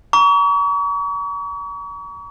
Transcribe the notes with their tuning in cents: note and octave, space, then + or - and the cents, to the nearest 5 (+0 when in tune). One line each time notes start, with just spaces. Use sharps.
A#5 +15 C#6 +40